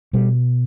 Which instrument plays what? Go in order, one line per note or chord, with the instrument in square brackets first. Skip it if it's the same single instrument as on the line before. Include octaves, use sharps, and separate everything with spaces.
[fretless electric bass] B2 G3